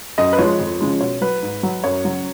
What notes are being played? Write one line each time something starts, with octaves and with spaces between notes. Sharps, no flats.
F#2 D#5
B4
F3 G#3 C#5
F2
C#3 F3 G#3
B2 C#5
F#3 B4
G#2
F#3
F#2 C#5
C#3 F#3